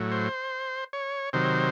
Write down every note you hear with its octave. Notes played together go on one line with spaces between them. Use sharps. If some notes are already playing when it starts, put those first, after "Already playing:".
Already playing: A2 F#3
C5
C#5
C3 D#3 F#3 C5